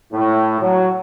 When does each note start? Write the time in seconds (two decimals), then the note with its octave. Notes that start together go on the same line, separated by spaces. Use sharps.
0.13 A2
0.60 F#3